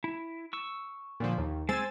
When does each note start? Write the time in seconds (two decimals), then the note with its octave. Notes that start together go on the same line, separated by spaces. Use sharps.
0.04 E4
0.53 C#6 E6
1.20 A#2 D3 F3
1.38 D#2
1.69 G#3 C4 C5 G#5 E6 A6